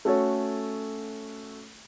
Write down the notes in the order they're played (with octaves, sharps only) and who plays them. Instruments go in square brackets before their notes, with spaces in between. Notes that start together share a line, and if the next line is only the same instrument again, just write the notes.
[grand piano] A3 C#4 F#4 A4 C#5